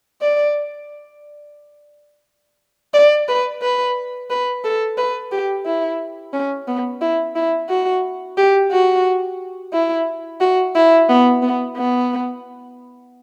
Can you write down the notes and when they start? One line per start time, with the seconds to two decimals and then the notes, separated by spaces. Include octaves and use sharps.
0.22 D5
2.94 D5
3.28 B4
3.62 B4
4.30 B4
4.64 A4
4.97 B4
5.31 G4
5.66 E4
6.33 C#4
6.67 B3
7.01 E4
7.35 E4
7.69 F#4
8.37 G4
8.71 F#4
9.73 E4
10.41 F#4
10.75 E4
11.09 B3
11.42 B3
11.77 B3